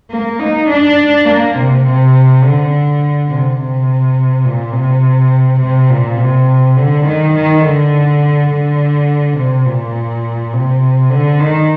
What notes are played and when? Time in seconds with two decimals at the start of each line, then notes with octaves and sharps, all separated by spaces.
0.10 A#3
0.40 D#4
0.69 D4
1.26 A#3
1.55 C3
1.84 C3
2.43 D3
3.29 C3
3.58 C3
4.45 A#2
4.73 C3
5.61 C3
5.90 A#2
6.18 C3
6.77 D3
7.06 D#3
7.35 D#3
7.64 D3
8.49 D3
9.37 C3
9.66 A#2
10.53 C3
11.10 D3
11.40 D#3